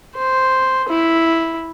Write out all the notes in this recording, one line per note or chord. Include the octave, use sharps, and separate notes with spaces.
C5
E4